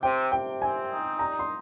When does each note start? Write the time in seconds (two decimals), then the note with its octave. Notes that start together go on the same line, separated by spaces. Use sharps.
0.03 C3 G5
0.32 C3 G5
0.61 C4 G#5
0.90 D#4
1.19 G3 A#5
1.39 C6